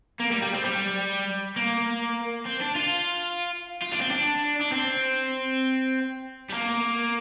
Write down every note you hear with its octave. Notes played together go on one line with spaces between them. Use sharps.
A#3
G3
G3
C4
G3
A#3
C4
D4
F4
F4
D4
C4
D4
D4
C4
G3
A#3